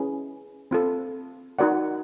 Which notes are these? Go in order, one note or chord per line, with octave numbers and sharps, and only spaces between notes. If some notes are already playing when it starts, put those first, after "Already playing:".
Already playing: C#4 E4 G#4 B4
C4 F4 A4
D#4 F#4 A#4 D5 F#5